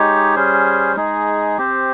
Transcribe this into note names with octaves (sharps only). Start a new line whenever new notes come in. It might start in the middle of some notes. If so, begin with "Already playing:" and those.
Already playing: G#3 D#4 G4 C#5
G3 C#4 G#4 C5
G#3 D#4 G#4
C4 G4 C5